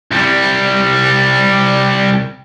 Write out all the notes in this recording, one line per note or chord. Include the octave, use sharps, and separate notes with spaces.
C2 G3